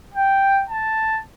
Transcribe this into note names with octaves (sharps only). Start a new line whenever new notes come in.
G5
A5